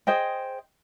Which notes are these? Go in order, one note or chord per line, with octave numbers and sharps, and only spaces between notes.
G#4 C5 D#5 G5